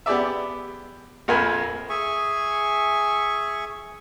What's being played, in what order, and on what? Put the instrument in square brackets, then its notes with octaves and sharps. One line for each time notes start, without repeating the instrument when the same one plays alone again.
[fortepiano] B3 G4 G#4 D5 E5
A#1 F2 A#4 G#5 B5
[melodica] G#4 E5 G#5 C#6